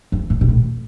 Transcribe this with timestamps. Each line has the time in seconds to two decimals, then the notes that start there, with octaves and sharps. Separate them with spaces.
0.12 F3
0.30 A2
0.41 B2
0.49 A2